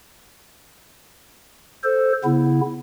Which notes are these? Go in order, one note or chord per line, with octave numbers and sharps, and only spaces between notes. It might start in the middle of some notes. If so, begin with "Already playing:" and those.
A4 C5
C#3 B3 E4